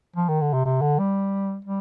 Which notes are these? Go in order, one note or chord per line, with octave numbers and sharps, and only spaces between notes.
F3
D#3
D3
C3
C3
D3
G3
G3